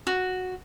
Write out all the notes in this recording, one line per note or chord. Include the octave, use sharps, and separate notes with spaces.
F#4